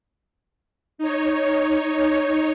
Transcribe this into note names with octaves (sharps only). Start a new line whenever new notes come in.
D#4 C#5